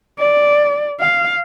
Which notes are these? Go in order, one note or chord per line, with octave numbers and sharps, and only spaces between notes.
D5
F5